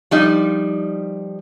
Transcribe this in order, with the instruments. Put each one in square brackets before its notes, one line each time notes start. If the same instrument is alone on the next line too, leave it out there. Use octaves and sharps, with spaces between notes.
[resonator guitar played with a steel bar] F3 G3 D#4